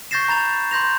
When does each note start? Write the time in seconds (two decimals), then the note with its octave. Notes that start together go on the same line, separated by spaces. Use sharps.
0.11 C#6 G6 A6 A#6 C7 E7
0.28 A#5 B5 A6 F7
0.71 C6 G6 A#6 F7